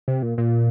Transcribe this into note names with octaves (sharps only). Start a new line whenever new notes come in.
C3
A#2
A#2